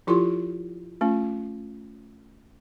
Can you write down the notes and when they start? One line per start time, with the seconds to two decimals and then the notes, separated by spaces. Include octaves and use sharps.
0.07 F3 E4 F4 G4 A4 C6
1.01 A3 C#4 F4